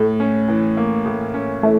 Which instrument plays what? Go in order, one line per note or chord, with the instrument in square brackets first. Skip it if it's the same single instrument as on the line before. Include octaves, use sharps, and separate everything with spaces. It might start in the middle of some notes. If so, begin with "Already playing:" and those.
Already playing: [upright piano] A2 [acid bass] A3
[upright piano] C#4
E3
A#3
A2
C#4
[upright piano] E3 [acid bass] A3